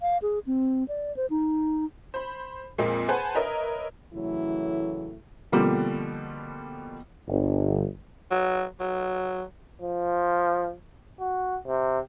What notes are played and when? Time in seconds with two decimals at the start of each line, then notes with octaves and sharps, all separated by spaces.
0.01 F5
0.22 G#4
0.47 C4
0.88 D5
1.16 C5
1.30 D#4
2.14 C5 B5
2.78 F2 A#2 G#3 A#3 C4
3.08 G#4 B4 C5 F#5 G#5 A5
3.35 A#4 B4 C#5 D#5 E5 A#5
4.14 A2 C#3 E3 F#3 A3 E4
5.52 B2 D3 F3 G3 A#3 C4
7.28 G1
8.31 F#3
8.80 F#3
9.81 F3
11.20 F#4
11.67 C3